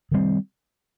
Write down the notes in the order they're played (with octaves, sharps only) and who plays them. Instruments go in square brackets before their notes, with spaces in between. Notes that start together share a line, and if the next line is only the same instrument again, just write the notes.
[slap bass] D#3 G3 C4